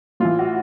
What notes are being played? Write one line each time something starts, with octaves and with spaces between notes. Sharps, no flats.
A2 E3 F4
F#4